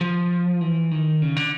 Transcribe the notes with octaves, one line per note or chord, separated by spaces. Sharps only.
F3
E3
D#3
C#3
D3